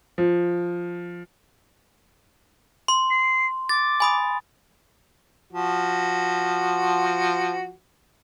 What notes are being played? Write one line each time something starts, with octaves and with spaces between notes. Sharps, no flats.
F3
C6
C7
D6 A6
G#5 B5 D#6
F3 F#4